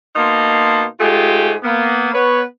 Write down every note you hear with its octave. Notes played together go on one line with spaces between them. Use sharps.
B2 A#3 D#4 A5 C6
G#2 G#3 A3 F4 G4 G#4
A#3 B3
B3 B4 C#5